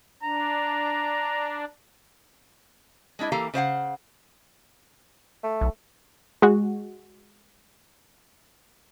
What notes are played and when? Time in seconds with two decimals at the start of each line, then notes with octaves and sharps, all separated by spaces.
0.23 D4 A#5
3.19 G#3 D4 E4 D#5
3.32 E3 A#3 G4 A4 F5 A#5
3.54 C#3 C5 F5 F#5
5.43 A3
5.61 B1
6.42 G#3 F#4